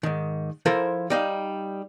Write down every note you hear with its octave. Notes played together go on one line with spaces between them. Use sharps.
G#2 D#3
F3 E4 A4 A#4 C5
G3 D#4 F5